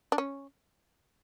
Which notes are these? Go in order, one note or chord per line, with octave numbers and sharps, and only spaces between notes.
D4
C#4